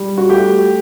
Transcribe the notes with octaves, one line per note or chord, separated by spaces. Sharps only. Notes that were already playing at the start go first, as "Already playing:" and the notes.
Already playing: G3
F#4
A3 G4